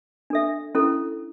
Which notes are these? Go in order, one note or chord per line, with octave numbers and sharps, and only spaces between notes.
D4 A4 E5
C#4 E4 A4